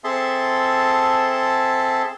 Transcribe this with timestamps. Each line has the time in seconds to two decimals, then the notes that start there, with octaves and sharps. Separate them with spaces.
0.04 C4 G#4 A4 E5 A5 C6